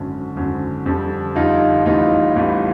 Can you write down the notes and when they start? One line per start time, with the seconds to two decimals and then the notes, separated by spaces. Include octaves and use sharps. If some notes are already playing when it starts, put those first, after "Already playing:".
Already playing: G#1 F#2 D3
0.36 G#1 F#2 D3
0.86 F2 D3 G3
1.35 F2 D3 G3 D#4 F4
1.86 A1 A2 E3 G3 D#4 F4
2.36 A1 A2 E3 G3